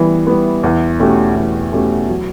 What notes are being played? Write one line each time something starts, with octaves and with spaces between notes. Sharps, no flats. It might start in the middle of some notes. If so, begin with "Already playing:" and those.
Already playing: E3 G3 B3
G3 B3
E2
B2 A3 C#4 G4
E2
B2 A3 C#4 G4
F#3